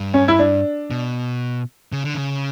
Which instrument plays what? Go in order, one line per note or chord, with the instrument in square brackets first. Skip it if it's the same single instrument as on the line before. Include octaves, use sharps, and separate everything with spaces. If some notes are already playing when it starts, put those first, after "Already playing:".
Already playing: [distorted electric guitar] G2
[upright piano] C#4
E4
D4
[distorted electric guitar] B2
C#3
D3
C#3